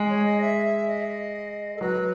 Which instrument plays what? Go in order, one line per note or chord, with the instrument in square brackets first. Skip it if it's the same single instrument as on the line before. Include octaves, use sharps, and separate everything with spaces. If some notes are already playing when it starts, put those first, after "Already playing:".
Already playing: [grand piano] G#3
[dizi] C#5
D#5
E5
D#5
A4
[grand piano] F#3 [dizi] B4